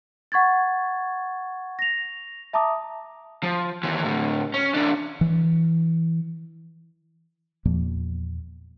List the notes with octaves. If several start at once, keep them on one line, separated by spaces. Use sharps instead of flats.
F#5 C#6 G#6 A6
A#6 F7
E5 A5 A#5 D6 D#6
F3
D#2 E3
A2 D3
C#4
E3 D4
E3
E2 A#2 F3 A#3